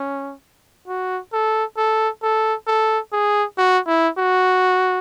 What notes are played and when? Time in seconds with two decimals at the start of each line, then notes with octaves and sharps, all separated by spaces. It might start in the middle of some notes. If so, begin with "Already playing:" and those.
Already playing: C#4
0.88 F#4
1.33 A4
1.77 A4
2.23 A4
2.67 A4
3.13 G#4
3.58 F#4
3.87 E4
4.18 F#4